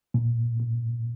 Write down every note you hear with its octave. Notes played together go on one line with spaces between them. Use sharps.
A#2
A#2